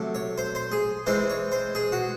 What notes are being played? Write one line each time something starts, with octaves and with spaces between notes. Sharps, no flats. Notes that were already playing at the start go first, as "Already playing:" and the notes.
Already playing: C3 F#3 A3
C#5
C5
C5
G#4
E3 G#3 C4 C5
C#5
C5
G#4
F#4